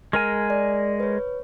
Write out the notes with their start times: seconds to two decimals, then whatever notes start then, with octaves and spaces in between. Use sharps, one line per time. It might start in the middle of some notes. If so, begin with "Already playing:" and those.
0.13 G#3 A#4 G#5 F6
0.50 D5
1.00 B4 C#5